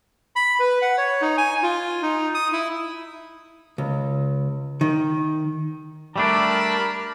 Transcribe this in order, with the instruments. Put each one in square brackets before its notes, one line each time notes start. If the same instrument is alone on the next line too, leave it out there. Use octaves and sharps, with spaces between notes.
[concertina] B5
B4
F#5
C#5
D#4
G#5
F4
D#4
D#6
E4
[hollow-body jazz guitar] C#2
D#3
[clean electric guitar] G3 A3 D4 [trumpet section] A#4 A5 B5